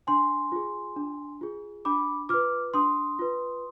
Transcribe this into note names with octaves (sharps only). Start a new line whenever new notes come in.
D4 G#5 C6
F4 G#4
D4
F4 G#4
D4 B5 D6
F4 B4 D6 F6
D4 C6 D#6
F4 B4